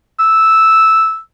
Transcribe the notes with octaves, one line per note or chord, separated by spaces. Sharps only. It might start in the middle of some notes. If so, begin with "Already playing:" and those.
E6